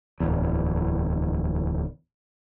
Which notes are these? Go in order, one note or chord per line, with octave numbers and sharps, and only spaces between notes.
D1 E2